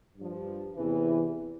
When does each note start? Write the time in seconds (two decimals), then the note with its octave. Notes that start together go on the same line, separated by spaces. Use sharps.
0.16 G2 F3
0.74 E2 C3 E3